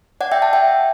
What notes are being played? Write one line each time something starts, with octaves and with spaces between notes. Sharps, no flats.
D5 F#5
E5 G5
F#5 A5
E5 G5